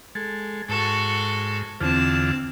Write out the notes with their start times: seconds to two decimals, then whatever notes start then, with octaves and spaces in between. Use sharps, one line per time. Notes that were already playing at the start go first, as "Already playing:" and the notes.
0.15 G#3 A4
0.69 G#2 F#4 A4
1.81 E2 D3 C4 F4 A5